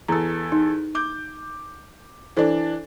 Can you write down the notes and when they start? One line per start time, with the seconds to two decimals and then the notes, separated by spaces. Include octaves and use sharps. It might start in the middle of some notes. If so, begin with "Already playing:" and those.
0.08 E2 A4 A#5
0.52 D#4
0.95 D6 G6
2.37 E3 D4 A4 C5